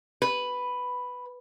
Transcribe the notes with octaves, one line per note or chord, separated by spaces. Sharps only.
B4